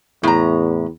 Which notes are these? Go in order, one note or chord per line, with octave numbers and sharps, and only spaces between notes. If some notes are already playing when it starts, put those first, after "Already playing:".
E2 A2 A#5